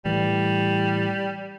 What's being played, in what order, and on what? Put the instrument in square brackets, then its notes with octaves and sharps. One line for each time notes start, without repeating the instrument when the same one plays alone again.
[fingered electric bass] A2 E3 [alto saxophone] G3